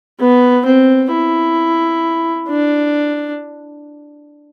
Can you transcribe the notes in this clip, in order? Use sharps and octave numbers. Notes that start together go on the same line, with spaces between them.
B3
C4
E4
D4